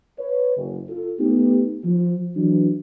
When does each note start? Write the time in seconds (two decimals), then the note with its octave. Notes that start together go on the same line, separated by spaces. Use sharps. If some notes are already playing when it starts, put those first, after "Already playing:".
0.19 B4 C#5
0.57 F#1
0.89 F4 A4
1.20 A3 B3 D#4 G4
1.84 F3
2.36 E3 F#3 D4